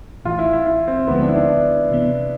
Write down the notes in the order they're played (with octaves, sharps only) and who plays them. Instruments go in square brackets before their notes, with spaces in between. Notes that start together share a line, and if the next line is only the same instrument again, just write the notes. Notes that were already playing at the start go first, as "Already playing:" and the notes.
[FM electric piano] A1 A2 E3 [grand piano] F4
[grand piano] E4
E4
E4
C4
[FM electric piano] D2 D3 F3 G#3 [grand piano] B3
[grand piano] D4
E4
D4
[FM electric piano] C3 E3 B3